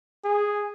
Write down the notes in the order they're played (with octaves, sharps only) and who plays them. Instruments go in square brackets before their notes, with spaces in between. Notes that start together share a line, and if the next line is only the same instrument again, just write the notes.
[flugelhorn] G#4